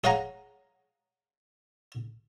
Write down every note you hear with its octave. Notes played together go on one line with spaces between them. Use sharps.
G#4 C#5 F5 F#5 G#5 A#5